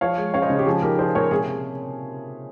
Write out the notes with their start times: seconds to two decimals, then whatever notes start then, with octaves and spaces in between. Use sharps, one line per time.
0.01 F3 C#5 F5
0.18 G#3
0.34 C#4 C#5 F5
0.42 C5 D#5
0.50 C#3 G#4
0.59 G4
0.66 F3 G#4
0.82 D#4 G4 A#4
0.99 F3 G#4 C5
1.15 A#2 A#4 C#5
1.31 C3 G#4
1.47 C3